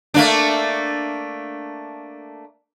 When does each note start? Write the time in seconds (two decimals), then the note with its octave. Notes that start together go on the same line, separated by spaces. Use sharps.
0.14 A3 A#3 D4